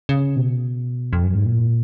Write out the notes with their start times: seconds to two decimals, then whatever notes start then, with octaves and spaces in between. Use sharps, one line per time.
0.09 C#3
0.36 B2
1.13 F2
1.24 F#2
1.35 G#2
1.46 A#2